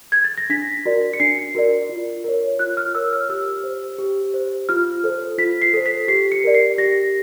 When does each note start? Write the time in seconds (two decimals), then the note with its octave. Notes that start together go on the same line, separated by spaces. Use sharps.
0.12 G#6
0.24 A6
0.38 A#6
0.50 D4 B6
0.86 F#4 A#4 D5
1.14 C#7
1.20 D4 C7
1.55 F#4 A#4 D5
1.89 F4
2.24 A#4 C#5
2.59 F4 F#6
2.77 F6
2.95 A#4 C#5 E6
3.12 F6
3.29 G4 E6
3.64 C5
3.98 G4
4.34 C5
4.69 F4 F6
5.04 A4 C5
5.38 F4 B6
5.62 C7
5.74 A4 C5
5.86 B6
6.08 G4 C7
6.32 C#7
6.44 A#4 D5
6.54 C7
6.78 G4 A#6